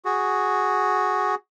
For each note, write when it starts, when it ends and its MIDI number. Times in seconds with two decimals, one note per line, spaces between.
0.05 1.35 66
0.05 1.35 68